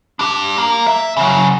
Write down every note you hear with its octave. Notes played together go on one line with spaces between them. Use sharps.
D4 G4
A#3
E5
C#3 F#3